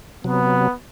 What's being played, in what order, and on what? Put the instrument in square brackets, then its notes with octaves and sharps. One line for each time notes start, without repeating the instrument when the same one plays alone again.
[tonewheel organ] C3 F#3 [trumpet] B3